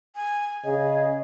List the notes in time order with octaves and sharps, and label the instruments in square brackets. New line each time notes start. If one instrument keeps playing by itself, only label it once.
[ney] G#5
[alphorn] C#3 [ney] G#4 [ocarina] D#5